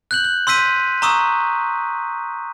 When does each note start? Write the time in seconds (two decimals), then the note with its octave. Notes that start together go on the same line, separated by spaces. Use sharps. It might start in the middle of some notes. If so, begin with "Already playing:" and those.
0.11 F#6 G6 F#7
0.24 F#6
0.47 C6 E6 G6 B6 D#7
1.02 A#5 C#6 D#6 E6